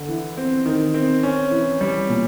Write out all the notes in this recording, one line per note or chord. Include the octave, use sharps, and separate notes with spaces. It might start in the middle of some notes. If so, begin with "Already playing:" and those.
Already playing: D3
E3
C4
D#3
C4
C#4
E3
G3
A#2